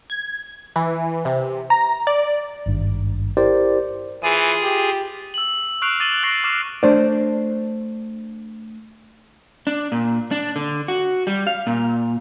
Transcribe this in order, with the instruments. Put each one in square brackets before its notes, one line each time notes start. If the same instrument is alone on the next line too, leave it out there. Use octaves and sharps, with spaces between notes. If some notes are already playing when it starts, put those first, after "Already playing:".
[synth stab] G#6
E3
C3
A#5
D5
[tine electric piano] G#1 G2
E4 G4 A#4 C5 D5
[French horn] E3 [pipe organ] F4 G#4 G#5
[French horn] G4
[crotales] E6 F#7
C#6 F6 F#6 C7 D7 F7
D6 A6 D#7 E7 F#7 G7
C#6 F#6 A#6 C7 D7 F7
C#6 D6 F6 C7 E7
[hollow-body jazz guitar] A3 D4 C5 D5
[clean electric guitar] D4
A#2
D4
D3
F#4
G3
F5
A#2